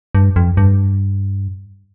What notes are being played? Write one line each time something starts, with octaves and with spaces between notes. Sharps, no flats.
G2
F2
G2